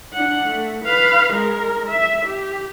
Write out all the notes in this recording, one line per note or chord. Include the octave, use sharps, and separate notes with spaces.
D4 F#5
A3
B4 F5
G#3 A#4
E5
G4